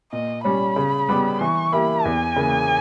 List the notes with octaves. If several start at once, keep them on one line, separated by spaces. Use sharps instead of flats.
A#2 D#5
G3 C#4 B5
C#3
G3 B3 G4
E3 C#6
A#3 E4 G4 B5
E2 G#5
C#3 E3 A#3